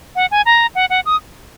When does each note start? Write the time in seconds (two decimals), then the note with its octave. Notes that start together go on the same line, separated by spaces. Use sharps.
0.16 F#5
0.31 G#5
0.46 A#5
0.75 F#5
0.90 F#5
1.06 D#6